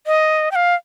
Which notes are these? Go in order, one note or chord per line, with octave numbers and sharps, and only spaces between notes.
D#5
G5
F5